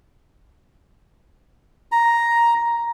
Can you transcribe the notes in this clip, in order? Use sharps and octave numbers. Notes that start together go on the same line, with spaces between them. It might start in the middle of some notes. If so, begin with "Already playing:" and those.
A#5